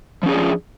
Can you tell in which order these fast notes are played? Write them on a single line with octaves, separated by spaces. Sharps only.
F3 C#4 G#4 D4 F4